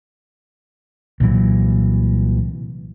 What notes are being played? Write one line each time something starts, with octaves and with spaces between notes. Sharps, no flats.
C2 A#2 E3 F#3